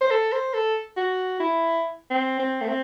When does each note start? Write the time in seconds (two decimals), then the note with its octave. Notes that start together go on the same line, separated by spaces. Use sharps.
0.01 C5
0.11 A4
0.33 C5
0.54 A4
0.97 F#4
1.40 E4
2.11 C4
2.39 C4
2.61 A3
2.68 C4